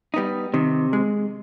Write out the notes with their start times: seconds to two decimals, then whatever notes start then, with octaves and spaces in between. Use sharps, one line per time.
0.14 G3 B3 D#4
0.54 C3 D#3
0.93 G#3